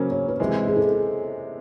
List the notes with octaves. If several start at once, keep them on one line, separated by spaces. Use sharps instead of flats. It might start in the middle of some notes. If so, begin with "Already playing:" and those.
Already playing: C#3 F#3 A#3 C#4 C5
C#5
B4
C3 E3 G#3 C5
G#4
A4